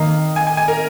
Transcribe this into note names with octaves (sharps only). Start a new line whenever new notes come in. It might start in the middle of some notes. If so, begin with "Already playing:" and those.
Already playing: D#3 A#3 D#5 F5
G#5
G#5
G#5
A#4